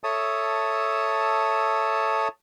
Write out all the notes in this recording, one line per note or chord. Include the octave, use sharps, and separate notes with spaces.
A4 C#5 E5 A5 D#6